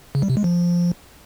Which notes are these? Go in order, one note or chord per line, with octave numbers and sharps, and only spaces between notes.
C#3
G3
C3
G#3
F3